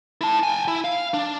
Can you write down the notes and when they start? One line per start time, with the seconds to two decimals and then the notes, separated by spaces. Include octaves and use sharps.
0.21 E4 A5
0.43 G5 G#5
0.68 E4
0.84 F5
1.14 D4